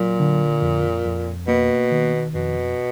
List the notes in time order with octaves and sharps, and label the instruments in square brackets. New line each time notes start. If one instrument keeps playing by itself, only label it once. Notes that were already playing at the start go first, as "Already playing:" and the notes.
Already playing: [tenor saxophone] A#2 [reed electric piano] F#3
[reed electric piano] D3
F2
F2
[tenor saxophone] B2 [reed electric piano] A#3
[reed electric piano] D#3
[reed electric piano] F2 [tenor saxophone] B2